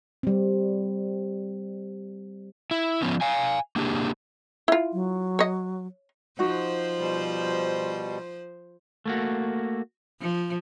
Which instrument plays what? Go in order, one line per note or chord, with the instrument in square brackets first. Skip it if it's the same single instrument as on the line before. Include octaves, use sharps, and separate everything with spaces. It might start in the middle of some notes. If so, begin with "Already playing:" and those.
[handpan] G3 C4
[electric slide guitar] E4
F3 B3 C#4
F5 G#5
A#3 D4 G4 G#4
[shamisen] E4 F4
[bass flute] F#3
[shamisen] C#5 D#5
[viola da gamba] F3 C5 [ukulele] D#4 F#4 F#5
[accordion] B2 G3
[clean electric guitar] A3 A#3 F#4
[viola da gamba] F3